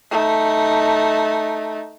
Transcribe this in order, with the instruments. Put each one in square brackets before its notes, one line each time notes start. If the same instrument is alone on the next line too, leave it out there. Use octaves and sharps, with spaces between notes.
[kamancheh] A3 D#4